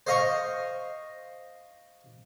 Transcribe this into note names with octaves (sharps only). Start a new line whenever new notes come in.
C5 D#5 F5 A#5 C#6